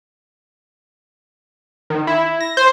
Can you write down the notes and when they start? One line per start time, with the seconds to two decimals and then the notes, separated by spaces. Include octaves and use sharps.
1.90 D#3
2.07 E4
2.40 A#6
2.57 C5